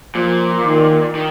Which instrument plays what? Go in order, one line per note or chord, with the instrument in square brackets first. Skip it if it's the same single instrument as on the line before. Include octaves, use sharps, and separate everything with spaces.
[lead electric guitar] A#2 [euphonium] F3
[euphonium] D#3
[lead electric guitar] D#3